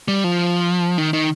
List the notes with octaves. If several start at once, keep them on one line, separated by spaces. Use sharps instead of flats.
G3
F3
D#3
D#3